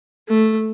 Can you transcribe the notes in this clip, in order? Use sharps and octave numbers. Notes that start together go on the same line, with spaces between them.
A3